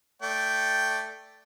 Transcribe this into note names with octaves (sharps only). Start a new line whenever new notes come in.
A3 D5 G5